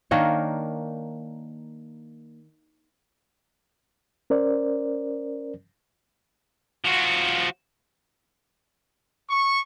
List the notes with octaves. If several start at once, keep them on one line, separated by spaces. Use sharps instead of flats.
D#3 A#3 D4 C#5
C#4 A#4 C5 D5
F3 F#4
C#6